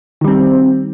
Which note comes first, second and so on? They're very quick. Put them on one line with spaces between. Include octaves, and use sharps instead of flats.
D#3 G3 C4